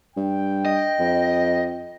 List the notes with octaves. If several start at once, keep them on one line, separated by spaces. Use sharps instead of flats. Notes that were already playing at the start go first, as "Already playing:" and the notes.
G2 G5
D#5
F2